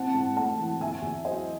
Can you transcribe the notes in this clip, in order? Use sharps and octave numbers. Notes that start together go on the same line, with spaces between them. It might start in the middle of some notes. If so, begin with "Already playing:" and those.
Already playing: E3 C4 F#5 A5
G#2
A3 F#5 A5
E3
E2 E5 G#5
E2
F#3 C5 D#5